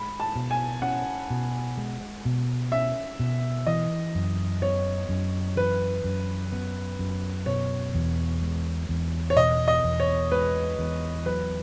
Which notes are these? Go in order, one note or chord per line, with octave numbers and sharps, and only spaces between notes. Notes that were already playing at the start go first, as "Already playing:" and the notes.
Already playing: G#3 B5
A5
B2
G#5
C#4 F#5
B2
G#3
B2
C#4 E5
B2
E3 D#5
F#2
B3 C#5
F#2
E3 B4
F#2
B3
F#2
B2 C#5
E2
G#3
E2
C#5
B2 D#5
D#5
E2
C#5
G#3 B4
E2
F#3 B4